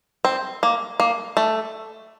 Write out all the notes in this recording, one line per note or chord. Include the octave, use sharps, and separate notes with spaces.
C4
A#3
A#3
A3